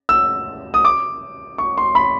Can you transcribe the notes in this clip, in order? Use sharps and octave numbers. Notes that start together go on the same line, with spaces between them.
E6
D#6
D6
C#6
C6
B5